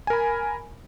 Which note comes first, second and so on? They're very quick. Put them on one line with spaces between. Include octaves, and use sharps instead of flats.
G#5 A#4 B5